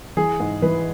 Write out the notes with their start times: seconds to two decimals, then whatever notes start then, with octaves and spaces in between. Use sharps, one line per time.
0.17 E3 G#4
0.40 G#2
0.62 E3 B4